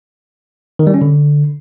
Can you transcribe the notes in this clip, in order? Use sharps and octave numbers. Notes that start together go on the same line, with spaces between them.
D#3
G3
C#4
D3